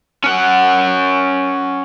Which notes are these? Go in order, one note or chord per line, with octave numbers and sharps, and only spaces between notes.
C#4 F#5